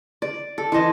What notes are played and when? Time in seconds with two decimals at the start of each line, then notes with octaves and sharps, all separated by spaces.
0.22 D5
0.58 A4
0.72 E3 C5 D#5 A5